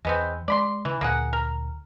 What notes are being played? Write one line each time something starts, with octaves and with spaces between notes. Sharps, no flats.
E2 G#3 B3 C4
G#3 D5 B5 C6
C#3 E3
D2 A#2 A#3 G#4 F#5
A#4